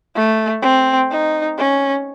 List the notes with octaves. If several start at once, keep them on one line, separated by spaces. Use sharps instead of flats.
A3
C4
D#4
C#4